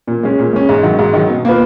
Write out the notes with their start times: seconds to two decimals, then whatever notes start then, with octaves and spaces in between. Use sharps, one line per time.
0.07 A#2
0.23 G#3 C#4
0.39 A#2
0.53 G#3 C#4
0.69 G#2
0.83 D#3 F#3
0.99 G#2
1.13 D#3 F#3
1.30 B2
1.45 A#3 F4 B4